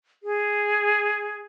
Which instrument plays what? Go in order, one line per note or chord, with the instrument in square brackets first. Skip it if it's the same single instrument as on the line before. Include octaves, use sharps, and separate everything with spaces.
[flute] G#4